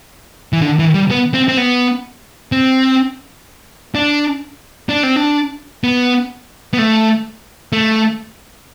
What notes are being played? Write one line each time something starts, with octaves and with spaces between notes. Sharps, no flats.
E3
D3
E3
G3
B3
C4
C4
B3
C4
D4
D4
C4
D4
B3
B3
A3
A3